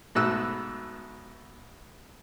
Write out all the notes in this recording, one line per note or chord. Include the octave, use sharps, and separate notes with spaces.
G#2 B2 A3 E6 F#6